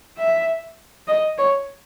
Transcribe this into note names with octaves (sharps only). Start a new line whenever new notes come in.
E5
D#5
C#5